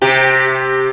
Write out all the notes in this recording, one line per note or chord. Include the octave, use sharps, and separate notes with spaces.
C3 G4